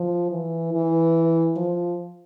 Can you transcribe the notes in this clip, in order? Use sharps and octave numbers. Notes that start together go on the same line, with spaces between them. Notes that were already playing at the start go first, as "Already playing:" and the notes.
Already playing: F3
E3
E3
F3